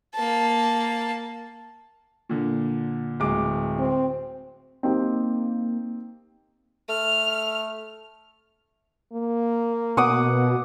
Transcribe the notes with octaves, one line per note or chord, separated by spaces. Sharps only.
A#3 A5
A#2 D3
D1 G#3 D6
C4
A#3 C4 D#4 G4
A3 F6
A#3
B2 F#5 D6 D#6